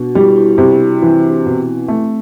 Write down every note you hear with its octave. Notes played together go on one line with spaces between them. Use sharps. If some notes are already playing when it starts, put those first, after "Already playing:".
Already playing: B2 D4 F#4
G3 E4 G4
E4 G4
C3 E4
E3 C4
D4
B2 C4
A3 C4